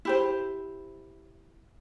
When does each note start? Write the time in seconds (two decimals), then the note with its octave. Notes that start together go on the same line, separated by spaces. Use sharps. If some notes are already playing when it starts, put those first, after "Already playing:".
0.05 E4 G4 C5